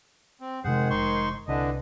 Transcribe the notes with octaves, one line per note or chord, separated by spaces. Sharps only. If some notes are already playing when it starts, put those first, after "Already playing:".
C4
F2 C3 D#3 G#3 G#4 C5 F#5
F1 D#4 C6 C#6
C2 D3 E3 D4 B4 D#5